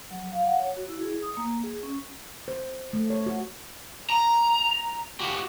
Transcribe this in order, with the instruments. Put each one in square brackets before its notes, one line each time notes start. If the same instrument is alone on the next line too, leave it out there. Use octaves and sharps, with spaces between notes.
[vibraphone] F#3
F5
F#5
C#5
F#4
E4
G#4
D#6
A#3
G#4
C#4
[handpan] C5
A3
C#5
F#4
[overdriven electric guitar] A#5
F#4 G4